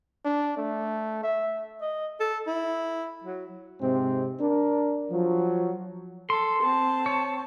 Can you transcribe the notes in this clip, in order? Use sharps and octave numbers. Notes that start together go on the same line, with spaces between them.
D4
A3
E5
D#5
A4
E4
F#3
G#2 C3 G#3 C4
D4 A#4
F3 F#3
A4 C6
C4 A5
C#5